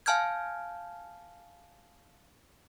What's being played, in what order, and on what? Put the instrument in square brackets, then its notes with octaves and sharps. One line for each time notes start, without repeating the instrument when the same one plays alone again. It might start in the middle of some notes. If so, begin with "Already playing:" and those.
[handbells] F5 G#5 A5 F6 G6 G#6